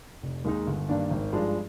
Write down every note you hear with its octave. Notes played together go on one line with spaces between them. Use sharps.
F1
D#2 D#3 G#3 D#4
G1
G2 D#3 A#3 D4
G#1
G2 F3 G#3 D4